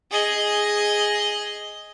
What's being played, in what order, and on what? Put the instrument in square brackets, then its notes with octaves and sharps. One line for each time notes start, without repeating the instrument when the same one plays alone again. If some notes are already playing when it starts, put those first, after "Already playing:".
[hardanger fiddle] G#4 D#5